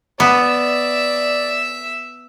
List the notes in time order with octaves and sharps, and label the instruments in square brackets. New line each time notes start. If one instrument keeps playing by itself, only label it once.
[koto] B3 [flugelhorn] D5 [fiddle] E5